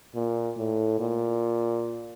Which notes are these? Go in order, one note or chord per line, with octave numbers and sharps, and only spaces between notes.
A#2
A2
A#2